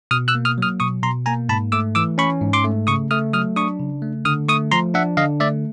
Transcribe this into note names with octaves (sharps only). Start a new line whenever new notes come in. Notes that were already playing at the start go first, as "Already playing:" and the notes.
B2 D#6 F6
E6 F#6
A#3
D#6 F6
F#3 D#6 F6
B2 C#6 D#6
B2 A#5 C6
A#3 G#5 A#5
G#2 A5 B5
A3 D6 E6
E3 D6 E6
C#4 B5 C#6
G#2
C6 D6
A3
C#3 C#6 D#6
A3 D#6 F6
F#3 D#6 F6
D4 C#6 D#6
C#3
A3
D3 D#6 F6
A3 C#6 D#6
F3 A#5 C6
D4 E5 F#5
D3 D#5 F5
A3 D5 E5